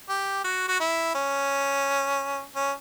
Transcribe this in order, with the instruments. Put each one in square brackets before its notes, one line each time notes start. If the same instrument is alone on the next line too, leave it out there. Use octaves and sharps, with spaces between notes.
[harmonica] G4
F#4
F#4
E4
C#4
C#4